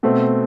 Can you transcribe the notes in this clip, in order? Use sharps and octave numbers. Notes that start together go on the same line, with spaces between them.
B2 A3 C4